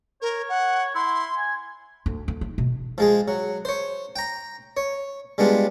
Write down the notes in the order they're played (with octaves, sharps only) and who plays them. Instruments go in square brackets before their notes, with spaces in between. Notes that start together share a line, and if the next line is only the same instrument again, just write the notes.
[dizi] A#4 [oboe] C#5
[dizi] F#5
[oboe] E4 [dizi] C6
[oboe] G#5
[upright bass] D2
D2
D#4
B2
[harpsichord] F3 G#3 G#4
F#3
C5 C#5
G5 A#5
C#5
G3 G#3 B3 D4 F4